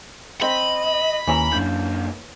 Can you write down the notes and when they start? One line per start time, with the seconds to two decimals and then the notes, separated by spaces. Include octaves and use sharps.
0.42 C4 D#5 B5
1.28 D#2 E3 C#4 E5 A#5
1.53 F#2 D3 A#3 D4 G6